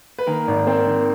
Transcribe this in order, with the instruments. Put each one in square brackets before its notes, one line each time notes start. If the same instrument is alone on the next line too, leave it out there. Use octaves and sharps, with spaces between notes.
[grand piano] B4
D#3 A#3 A#4
G#1
D#3 C4 C5
D#3